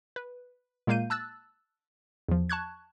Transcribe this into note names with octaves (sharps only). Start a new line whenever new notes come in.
B4
A#2 G#3 A#3 F5 G6 D#7
A5 E6 F#6 A6
E2 F3
A5 C#6 F#6 G#6